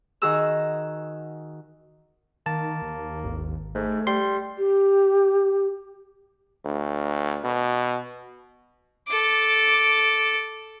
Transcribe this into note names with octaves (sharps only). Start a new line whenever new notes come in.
D#3 F#4 G#4 A#5 E6
D#3 A#3 A5
D#2
G#1
G#2 A3
G3 C6
G4
D2
B2
A4 D6